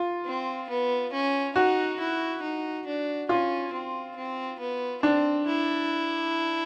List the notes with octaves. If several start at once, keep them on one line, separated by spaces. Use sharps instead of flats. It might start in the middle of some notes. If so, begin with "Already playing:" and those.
Already playing: F4
C4
B3
C#4
D#4 F#4
E4
D#4
D4
C#4 F4
C4
C4
B3
C4 D4
E4